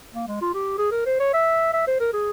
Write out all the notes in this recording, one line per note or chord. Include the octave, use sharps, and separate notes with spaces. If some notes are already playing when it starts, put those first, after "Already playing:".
A#3
G#3
F4
G4
G#4
A#4
C5
C#5
E5
E5
C5
A#4
G#4